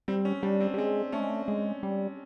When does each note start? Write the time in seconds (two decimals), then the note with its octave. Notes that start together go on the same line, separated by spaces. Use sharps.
0.08 G3 C4
0.25 C#4
0.43 G3 D4
0.60 C4
0.74 G3
0.78 G#3 C4
1.12 A3 C#4
1.20 G#3
1.28 A3
1.48 G#3
1.83 G3